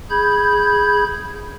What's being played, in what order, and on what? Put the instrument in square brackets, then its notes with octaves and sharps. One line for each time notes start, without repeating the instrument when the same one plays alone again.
[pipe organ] G#4 B5 G6 G#6